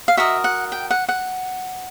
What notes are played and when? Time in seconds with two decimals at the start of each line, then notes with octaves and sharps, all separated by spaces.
0.08 F5
0.17 F#4 A#4 D#5 E5
0.44 F#5
0.72 G5
0.91 F#5
1.09 F#5